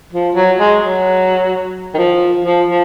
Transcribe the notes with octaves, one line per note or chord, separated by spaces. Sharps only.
F3
F#3
G#3
F#3
D#3
F3
F3
F3